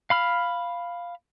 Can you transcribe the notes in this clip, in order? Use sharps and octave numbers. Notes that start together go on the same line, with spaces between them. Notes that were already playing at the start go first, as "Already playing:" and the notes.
F5 B5 F6